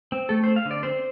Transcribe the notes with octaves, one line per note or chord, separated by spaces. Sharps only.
C4
A3 A4
C4 C5
F5
D3
D5
C4 C5